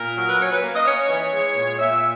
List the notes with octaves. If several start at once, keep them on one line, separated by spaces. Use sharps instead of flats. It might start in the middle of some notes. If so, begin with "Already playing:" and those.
Already playing: A#2 A#4
F#3
B4
C#4 C#5
B4
A#3
D#5
C#4 C#5
E3
G#3
A#2
A#2 E5